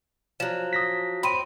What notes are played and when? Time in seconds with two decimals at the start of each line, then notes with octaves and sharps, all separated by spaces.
0.40 F3 F#3 E7
0.73 D#6 A#6 B6
1.23 C4 B5 C6 D#7